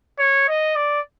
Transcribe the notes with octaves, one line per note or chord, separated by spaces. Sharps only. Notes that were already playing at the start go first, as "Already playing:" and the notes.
C#5
D#5
D5